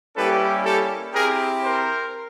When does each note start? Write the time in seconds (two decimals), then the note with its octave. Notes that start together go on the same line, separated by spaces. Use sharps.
0.15 G3 A#3 C#4 E4 G4 A4 B4
0.64 G4 A4
1.13 C4 E4 G4 G#4 A#4
1.62 A#4 C5